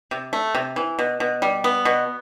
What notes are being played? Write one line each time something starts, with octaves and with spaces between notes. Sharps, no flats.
C3
A3
C3
E3
B2
B2
G3
B3
B2